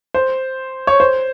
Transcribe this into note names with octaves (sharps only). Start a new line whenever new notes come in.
C5
C#5
C5